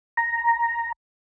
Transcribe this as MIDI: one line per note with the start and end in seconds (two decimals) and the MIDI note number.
0.17 0.92 82